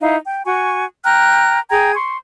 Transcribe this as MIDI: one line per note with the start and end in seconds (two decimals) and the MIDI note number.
0.01 0.16 63
0.01 0.16 64
0.01 0.16 77
0.25 0.42 79
0.46 0.85 66
0.46 0.85 80
0.46 0.85 85
1.04 1.59 79
1.04 1.59 82
1.04 1.59 89
1.04 1.59 90
1.71 1.94 68
1.71 1.94 79
1.71 1.94 82
1.71 1.94 92
1.95 2.17 84
1.95 2.17 85